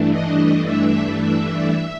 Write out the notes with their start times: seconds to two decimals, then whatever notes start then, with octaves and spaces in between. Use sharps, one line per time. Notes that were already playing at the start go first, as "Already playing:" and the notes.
Already playing: G2 E3 A3 D4
0.11 D#5
0.65 E5
1.21 E5